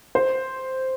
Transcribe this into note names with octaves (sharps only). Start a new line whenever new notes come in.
C5